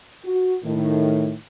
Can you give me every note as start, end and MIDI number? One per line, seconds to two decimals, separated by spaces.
0.25 0.55 66
0.64 1.33 45
0.64 1.33 51